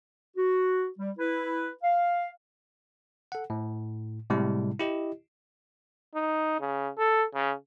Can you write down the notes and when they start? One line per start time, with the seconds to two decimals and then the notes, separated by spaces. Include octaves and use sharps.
0.37 F#4
0.99 G3
1.18 E4 B4
1.83 F5
3.32 A4 F#5
3.50 A2
4.30 A2 C3 G3 G#3 E4
4.79 E4 G4 D#5
6.15 D#4
6.60 C#3
6.98 A4
7.34 C#3